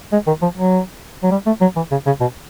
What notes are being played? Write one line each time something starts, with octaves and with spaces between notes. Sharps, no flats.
G#3
D#3
F3
F#3
F#3
G3
A3
F#3
E3
C#3
C#3
B2